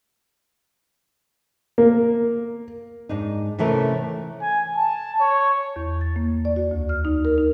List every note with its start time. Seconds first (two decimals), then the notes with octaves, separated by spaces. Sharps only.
1.78 A#3
3.09 G#2 D4 D#4
3.59 C3 E3 A3 C#4 A#4 B4
4.41 G#5
4.76 A5
5.20 C#5
5.76 E2
6.01 A6
6.16 A#3
6.45 D5
6.56 F#4
6.71 D2
6.89 F6
7.05 D#4
7.25 A#4
7.38 D#4